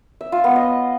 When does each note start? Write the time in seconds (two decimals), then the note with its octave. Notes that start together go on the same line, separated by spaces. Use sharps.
0.21 E5
0.32 F4
0.44 B3
0.56 D#5